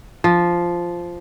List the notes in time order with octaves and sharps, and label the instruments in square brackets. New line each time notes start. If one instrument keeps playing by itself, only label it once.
[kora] F3